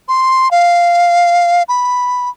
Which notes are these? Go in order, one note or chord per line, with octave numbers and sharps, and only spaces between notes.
C6
F5
B5